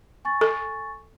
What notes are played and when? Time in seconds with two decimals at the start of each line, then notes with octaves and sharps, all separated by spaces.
0.25 G#5 C#6 A6
0.41 A4